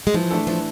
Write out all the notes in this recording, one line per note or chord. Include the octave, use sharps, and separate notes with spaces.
G#3
E3 F3
A3 D4 A4
E3 F3